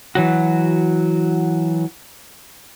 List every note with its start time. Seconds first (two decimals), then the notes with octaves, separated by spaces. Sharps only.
0.15 E3 F#3 F#4